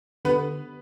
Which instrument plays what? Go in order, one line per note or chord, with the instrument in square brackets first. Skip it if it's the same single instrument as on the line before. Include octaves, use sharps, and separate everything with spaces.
[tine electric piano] D3 [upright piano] B3 B4